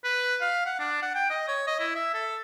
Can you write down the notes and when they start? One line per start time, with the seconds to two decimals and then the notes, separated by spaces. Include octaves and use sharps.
0.04 B4
0.41 F5
0.66 F#5
0.79 D4
1.02 F#5
1.15 G5
1.30 D#5
1.48 C#5
1.67 D#5
1.80 E4
1.95 E5
2.14 A4